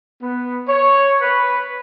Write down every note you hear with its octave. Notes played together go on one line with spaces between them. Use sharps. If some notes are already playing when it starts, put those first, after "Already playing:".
B3
C#5
B4